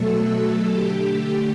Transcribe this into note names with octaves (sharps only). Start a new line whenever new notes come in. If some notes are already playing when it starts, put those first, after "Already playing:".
Already playing: B2 F#3 A3 A4
D3 A3 G4